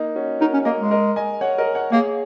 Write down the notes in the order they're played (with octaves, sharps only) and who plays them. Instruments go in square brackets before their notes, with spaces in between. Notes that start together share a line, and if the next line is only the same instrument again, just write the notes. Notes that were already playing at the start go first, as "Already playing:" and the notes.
Already playing: [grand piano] A#3 D#4
C#4 F#4
[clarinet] D#4 [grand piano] F#4 A#4
[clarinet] C#4
[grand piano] C#5
[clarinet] A#3 [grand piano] A#4 D#5
[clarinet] G#3
[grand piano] A#4 D#5
D#5 G#5
C#5 F#5
A#4 D#5
C#5 F#5
[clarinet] A#3 [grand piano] G#4 C#5